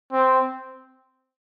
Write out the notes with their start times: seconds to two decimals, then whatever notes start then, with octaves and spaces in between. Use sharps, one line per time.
0.12 C4